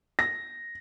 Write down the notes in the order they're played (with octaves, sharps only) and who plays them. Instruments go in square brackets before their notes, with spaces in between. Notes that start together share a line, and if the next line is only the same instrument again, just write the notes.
[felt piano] A#6